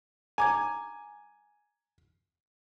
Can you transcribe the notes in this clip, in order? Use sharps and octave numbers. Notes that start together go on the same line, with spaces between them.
G#5 A#5 D6 G#6